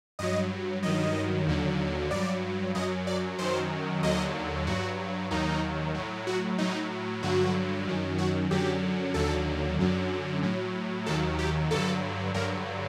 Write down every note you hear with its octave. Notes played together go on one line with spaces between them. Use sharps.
G2 F#3 D#5
G2 D#3 F#3 D#5
D#2 D3 F#3
G2 F#3 D5
F#2 F#3 D#5
D5
F#2 D#3 F#3 C5
D#2 D3 F#3 D#5
G2 F#3 F#4
D#2 D#3 F#3 D#4
A2 F#3
F#4
A2 F#3 D#4
G2 D3 F#3 F#4
F#2 D#3 F#3
F#4
F#2 D3 F#3 G4
D#2 D3 F#3 A4
F#2 D3 F#3
A2 F#3
D#2 D#3 F#3 A4
G4
G2 D3 F#3 A4
G2 D3 F#3 A#4